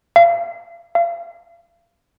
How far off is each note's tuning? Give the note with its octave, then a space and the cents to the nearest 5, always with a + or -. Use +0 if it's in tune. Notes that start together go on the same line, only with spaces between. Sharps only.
F5 -35
F5 -35